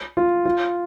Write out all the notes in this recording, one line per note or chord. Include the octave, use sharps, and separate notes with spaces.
F4
F4